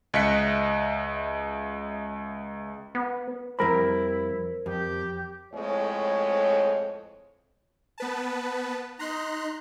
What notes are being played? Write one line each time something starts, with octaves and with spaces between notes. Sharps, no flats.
C#2 D#5 E5 F#6 B6 C#7
B3
F2 G3 E4 A#4 C5 B5
F2 G4
F2 A2 G#3 C#5
B3 B4 A5
D#4 A#5 C6 F#6